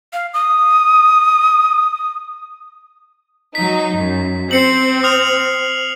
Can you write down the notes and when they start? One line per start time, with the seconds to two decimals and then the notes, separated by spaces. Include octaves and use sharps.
0.13 F5
0.34 D#6
3.55 F#3 D#4 B6
3.97 F#2
4.51 C4 C7 C#7 F#7
5.03 D#6 F6 F7